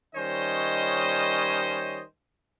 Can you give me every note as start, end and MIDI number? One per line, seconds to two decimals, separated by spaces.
0.15 2.02 51
0.15 2.02 55
0.15 2.02 61
0.15 2.02 72
0.15 2.02 73
0.15 2.02 75